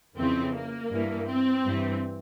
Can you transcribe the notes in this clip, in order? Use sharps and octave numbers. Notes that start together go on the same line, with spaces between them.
F2 C#3 E3 C4
A#3
G2 E3
C4
G2 E3